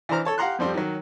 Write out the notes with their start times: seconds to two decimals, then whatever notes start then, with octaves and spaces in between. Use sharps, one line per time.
0.09 E3 D4 C5 A#5 F6
0.25 A4 C#5 A5
0.38 G4 F5 F#5 A#5 C6 F#6
0.59 F2 F3 G3 C4
0.74 D#3 F#3